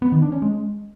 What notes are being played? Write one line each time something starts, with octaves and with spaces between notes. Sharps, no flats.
B3
D#3
D4
C#4
G#3